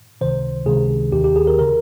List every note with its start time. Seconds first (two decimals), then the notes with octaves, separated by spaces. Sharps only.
0.21 C#2 C3 D#3 C5
0.66 C#2 C3 D#3 G#4
1.12 D#2 D#3 G4
1.24 G4
1.36 G#4
1.47 A#4
1.59 C#3 A#4